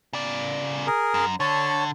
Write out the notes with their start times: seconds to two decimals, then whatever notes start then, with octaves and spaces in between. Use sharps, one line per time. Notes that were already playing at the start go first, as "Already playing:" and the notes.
0.13 C#3 D5
0.87 G#4 A#4
1.14 F#2
1.40 D3 C#5 A5